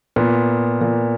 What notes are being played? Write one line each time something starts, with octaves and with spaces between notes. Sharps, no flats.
A#2 B3
A#2